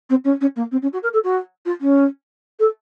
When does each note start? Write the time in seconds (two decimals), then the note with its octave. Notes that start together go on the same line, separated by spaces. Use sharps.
0.10 C4
0.25 C#4
0.41 C#4
0.56 A#3
0.72 C4
0.82 C#4
0.93 F#4
1.03 A#4
1.13 A4
1.24 F#4
1.66 F4
1.81 C#4
2.59 A4